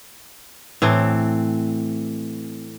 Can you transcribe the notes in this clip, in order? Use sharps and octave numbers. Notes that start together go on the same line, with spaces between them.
A2 E3 C4